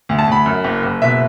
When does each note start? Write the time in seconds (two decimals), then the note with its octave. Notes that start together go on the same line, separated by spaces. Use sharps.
0.09 D2
0.19 A5
0.28 D2 B5
0.46 F#2
0.64 F#1
0.83 F#1
1.02 B2 E5